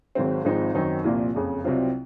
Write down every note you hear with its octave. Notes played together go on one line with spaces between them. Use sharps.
G#1 G#2 F#3 C4
G#1 G#2 F3 C4 D#4
F#2 D#3 F#3 C4 D#4
C2 A#2 F3 A#3
F#1 F2 C#3
C2 C3 F#3 C4 F4